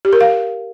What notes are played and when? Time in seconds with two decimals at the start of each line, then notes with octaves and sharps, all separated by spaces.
0.05 G4
0.13 A#4
0.21 F5